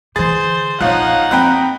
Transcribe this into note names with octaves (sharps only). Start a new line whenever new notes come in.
D3 E3 G#4 C5 A6
A#1 F2 F3 D#4 C#5 F5 F#5 F#6
F2 A#3 C4 G5 A#5 B5 F#6